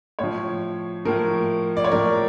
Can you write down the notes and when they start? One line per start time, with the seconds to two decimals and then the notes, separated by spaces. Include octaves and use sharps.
0.19 A2 F3 C#5
1.05 A2 F3 A#4
1.77 D5
1.84 C#5
1.92 A2 F3 A#4